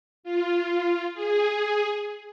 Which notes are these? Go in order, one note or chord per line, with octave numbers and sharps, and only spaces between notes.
F4
G#4